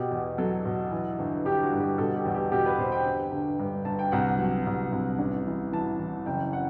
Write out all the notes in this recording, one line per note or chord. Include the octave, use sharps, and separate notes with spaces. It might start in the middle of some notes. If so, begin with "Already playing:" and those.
Already playing: B2 G4
E2
F#3 A4
B2
E3
G1
G1 G4
F#4
G2
G4
B2 A4
G4
E2
G4
B2 G4
B4
B2 C5
G5
G1
G1
G2
G1 A5
G5
C2 F#5
F#3
C2
C2
A1
E3
E3 A5
E3
F#1 G5
F#5